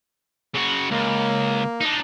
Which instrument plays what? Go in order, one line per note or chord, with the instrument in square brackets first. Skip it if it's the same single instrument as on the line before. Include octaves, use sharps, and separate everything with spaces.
[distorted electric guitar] C#3 F#4
[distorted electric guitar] C#2 [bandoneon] A#3
[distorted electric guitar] D4 D#4